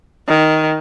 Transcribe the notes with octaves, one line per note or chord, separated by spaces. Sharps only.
D#3